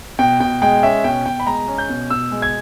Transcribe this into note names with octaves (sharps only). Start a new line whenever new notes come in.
B2 G5
B2 G5
G#3 G5
C#4 E5
B2 G5
B2 G5
B5
G#3 A#5
C#4
G6
B2
B2 E6
G#3
G#6